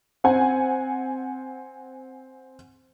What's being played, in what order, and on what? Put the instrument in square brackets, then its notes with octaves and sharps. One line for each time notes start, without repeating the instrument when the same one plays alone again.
[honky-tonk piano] C4 F#5 G#5